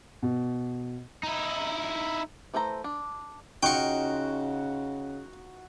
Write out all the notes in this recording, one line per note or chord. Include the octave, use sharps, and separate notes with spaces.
B2
D#4 E4
E3 A3 A4 C5 A#5
D4
C#3 D#4 F4 F#4 G5 C#6